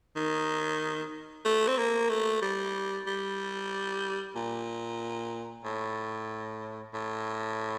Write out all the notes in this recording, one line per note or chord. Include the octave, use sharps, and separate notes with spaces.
D#3
A3
C4
A#3
A3
G3
G3
A#2
A2
A2